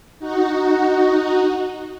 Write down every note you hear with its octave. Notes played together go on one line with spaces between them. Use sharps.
D#4 F#4